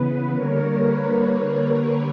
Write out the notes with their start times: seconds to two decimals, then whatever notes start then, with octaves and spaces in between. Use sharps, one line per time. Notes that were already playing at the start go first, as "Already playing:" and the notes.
Already playing: C#3 E3 B3 B4
0.32 D3 G3 A#3 A#4 C#5
0.74 B4
1.15 A#4 C#5